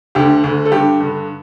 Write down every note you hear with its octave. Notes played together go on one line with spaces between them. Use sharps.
D2 D3 G4
D2 D3
A4
G2 D3 G4
G2 D3